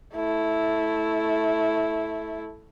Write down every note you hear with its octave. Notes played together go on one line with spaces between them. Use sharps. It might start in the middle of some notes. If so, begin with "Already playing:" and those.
A3 E4